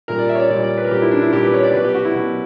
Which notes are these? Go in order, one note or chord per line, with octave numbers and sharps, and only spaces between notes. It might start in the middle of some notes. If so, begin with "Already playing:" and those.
A#2 G3 A#4
D5
E5
C#5
D5
A#2 G3 D5
D5
B4
A#4
A#2 G3 G4
E4
D4
E4
A#2 G3 G4
B4
C#5
D5
B2 F#3 B4
G4
F#4
E4
B2 F#3